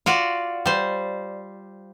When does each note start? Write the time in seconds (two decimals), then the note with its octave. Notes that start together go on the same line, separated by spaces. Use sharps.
0.06 F4 F#4 D5
0.66 G3 C5